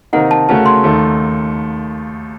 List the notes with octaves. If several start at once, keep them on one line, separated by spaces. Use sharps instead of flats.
C3 D#3 A#3 D#4 A#4 F#5
A5
C#3 A3 C#4 F#4 A#4 A5
C6
D#2 D#3 A3